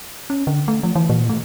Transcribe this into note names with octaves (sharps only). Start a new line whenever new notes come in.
C#4
D3
A3
F3
E3
A#2
A3